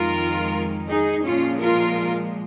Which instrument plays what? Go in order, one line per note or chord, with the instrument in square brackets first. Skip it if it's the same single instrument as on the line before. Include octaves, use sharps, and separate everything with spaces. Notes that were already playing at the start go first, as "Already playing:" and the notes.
Already playing: [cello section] F2 D#3 G#3 F4 A#4
D#4 G#4
A#2 F3 G#3 C#4 F4
F4 A#4